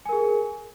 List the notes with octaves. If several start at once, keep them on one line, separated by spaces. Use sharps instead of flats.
G#4 A#4 G#5